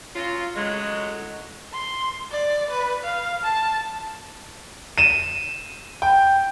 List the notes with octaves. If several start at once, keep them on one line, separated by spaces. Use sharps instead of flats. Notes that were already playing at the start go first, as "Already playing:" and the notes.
F#3 C#4 F4
A2 C#3 F#3 G#3
C6
D5
B4
F5
A5
D#7 E7
G5